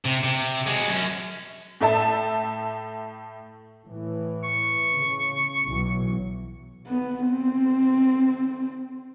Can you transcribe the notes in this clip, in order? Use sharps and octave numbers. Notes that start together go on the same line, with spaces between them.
C3
C3
G#3 F#4
F#2 C#4
A2 A3 E5 A5
A2 E3
C#6
C#3
B1 E3 F#3
B3
C4